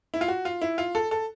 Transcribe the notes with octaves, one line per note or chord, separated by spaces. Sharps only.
E4
F4
F#4
F4
E4
F4
A4
A4